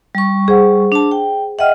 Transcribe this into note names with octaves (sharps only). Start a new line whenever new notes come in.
G3 C#6
G#4 C5 F#5
D4 A5
G5
D#5 E5 F#5 G5 F6